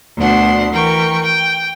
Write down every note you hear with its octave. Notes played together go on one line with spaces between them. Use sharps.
D2 B2 D4 F#5 C6
E3 A#4 G5 C#6
G5